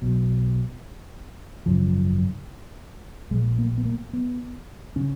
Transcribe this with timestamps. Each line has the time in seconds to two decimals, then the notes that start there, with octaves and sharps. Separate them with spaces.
0.02 B1 B2
1.66 G#1 F#2 C#3 F3
3.31 A#1 A#2 G#3
3.59 A#3
3.78 B3
3.85 A#3
4.13 B3
4.96 C#3 C#4